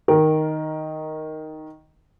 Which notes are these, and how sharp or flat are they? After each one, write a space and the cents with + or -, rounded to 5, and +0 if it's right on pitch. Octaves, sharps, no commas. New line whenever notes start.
D#3 +0 A#4 +5